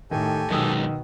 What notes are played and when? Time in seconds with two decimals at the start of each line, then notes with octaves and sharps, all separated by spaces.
0.11 A2 D#3 G4 A4 G#5
0.51 F#2 B2 D#3 G#3 D#6 E6